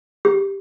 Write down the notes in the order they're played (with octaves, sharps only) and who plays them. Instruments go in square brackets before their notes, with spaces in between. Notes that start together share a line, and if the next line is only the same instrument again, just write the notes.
[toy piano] G4